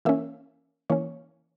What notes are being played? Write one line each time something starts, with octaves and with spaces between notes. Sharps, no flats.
E3 A#3 C#4 E5
E3 A#3 C#4 C#5